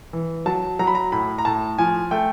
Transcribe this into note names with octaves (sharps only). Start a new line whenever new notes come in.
E3
F#3 A5
F#3 A#5
B5
A#5
A2 B5
A#5
A2 A5
F3 G#5
A3 G5